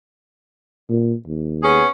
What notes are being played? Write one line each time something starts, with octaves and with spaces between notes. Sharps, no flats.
A#2
D#2
B3 C#4 G#4